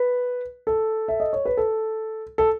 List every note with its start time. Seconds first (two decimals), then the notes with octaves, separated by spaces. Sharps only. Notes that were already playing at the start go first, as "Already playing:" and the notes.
Already playing: B4
0.67 A4
1.08 E5
1.20 D#5
1.33 C#5
1.45 B4
1.57 A4
2.38 A4